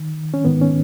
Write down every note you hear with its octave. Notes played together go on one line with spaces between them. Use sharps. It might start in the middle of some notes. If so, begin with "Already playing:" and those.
Already playing: D#3
C#4
G#2 D#3 B3
C#4